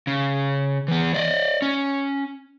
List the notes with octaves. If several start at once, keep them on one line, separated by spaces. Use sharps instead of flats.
C#3
E3 B3
D5 D#5
C#4